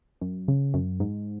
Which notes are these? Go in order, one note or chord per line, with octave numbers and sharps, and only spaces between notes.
F#2
C#3
F#2
G#2